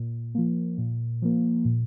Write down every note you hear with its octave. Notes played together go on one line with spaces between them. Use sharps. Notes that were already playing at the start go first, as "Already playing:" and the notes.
Already playing: A#2
F3 A#3
A#2
F3 A#3
A#2